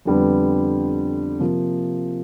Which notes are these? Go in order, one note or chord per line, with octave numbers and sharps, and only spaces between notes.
F2 D3 G3 B3
C3 F3 A#3